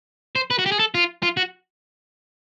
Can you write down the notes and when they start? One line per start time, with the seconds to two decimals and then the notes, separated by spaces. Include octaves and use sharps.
0.35 C5
0.51 B4
0.59 F#4
0.66 G4
0.72 G#4
0.79 A4
0.95 F4
1.23 F4
1.37 F#4